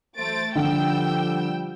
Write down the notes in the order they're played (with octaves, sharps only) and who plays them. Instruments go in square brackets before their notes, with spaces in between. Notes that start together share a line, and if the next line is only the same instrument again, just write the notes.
[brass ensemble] E3 F#3 C5 [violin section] A3 A6 D7
[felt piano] D3 [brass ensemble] F3 G3 [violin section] G5 E6